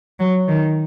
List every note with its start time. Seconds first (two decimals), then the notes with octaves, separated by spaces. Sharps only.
0.20 F#3
0.48 D#3